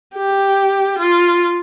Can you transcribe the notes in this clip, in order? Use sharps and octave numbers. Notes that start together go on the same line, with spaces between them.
G4
F4